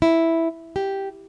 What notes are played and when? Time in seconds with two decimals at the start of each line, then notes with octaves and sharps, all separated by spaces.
0.02 E4
0.76 G4